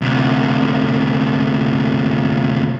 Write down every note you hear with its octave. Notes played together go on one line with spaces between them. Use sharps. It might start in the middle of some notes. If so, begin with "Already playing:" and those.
D2 C3